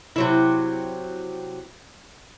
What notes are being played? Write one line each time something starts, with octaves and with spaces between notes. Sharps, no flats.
C3 F#3 E4